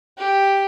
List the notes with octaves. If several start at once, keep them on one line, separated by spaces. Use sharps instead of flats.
G4